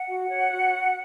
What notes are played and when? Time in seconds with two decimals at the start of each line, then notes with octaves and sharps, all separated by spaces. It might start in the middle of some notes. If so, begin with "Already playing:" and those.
Already playing: F#5
0.08 F#4
0.29 C#5
0.51 F#4